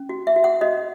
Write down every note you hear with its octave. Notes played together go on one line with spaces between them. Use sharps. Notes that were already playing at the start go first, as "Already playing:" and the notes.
Already playing: C#4
F#4
E5
F#4
F#5
F#4 D#5